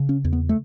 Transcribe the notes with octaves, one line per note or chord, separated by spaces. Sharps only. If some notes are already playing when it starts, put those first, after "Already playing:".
Already playing: C#3
C#4
E2
B3
A3